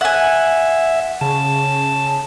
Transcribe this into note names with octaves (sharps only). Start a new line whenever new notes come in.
E5 F#5 G#5
C#3 A5